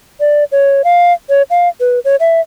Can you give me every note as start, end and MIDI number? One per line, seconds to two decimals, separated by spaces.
0.20 0.44 74
0.52 0.82 73
0.84 1.13 77
1.29 1.42 73
1.50 1.68 77
1.80 1.99 71
2.05 2.16 73
2.20 2.41 76